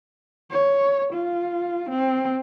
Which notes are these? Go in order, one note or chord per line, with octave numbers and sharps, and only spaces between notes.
C#5
F4
C4